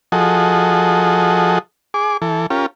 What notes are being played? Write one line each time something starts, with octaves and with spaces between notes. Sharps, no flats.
F3 F#4 G#4 A4 D#5
G#4 D6
E3 A4
C#4 F4 G4 A#4